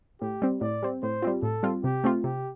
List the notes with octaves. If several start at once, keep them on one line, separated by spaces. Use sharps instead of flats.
A2 G4
G3 C4
A2 D5
G3 C4
A2 C5
G3 C4 F4
A2 A4
G3 C4 F4
C3 G4
A3 C4 F4
C3 G4